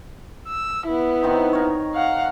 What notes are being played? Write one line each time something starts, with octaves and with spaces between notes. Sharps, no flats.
E6
B3 E4
D#3 C4 D#4
A#4 C#5
F5 F#5